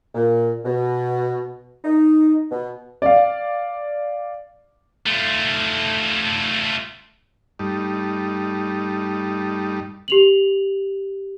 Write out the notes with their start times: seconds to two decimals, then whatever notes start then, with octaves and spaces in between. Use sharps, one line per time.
0.15 A#2
0.65 B2
1.85 D#4
2.51 B2
3.02 D5 F5
5.06 A3 F4
7.59 G2 G3 A3 D#4
10.08 G4 F7 F#7